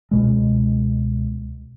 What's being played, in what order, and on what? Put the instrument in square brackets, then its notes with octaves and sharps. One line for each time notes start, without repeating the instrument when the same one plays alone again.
[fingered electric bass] C#2 B2 G#3